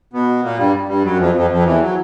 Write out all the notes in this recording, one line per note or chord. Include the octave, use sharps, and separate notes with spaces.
B2 B3
A#2 A#3
G2 G3
G2 G3
F#2 F#3
F2 F3
F2 F3
F2 F3
E2 E3
F#3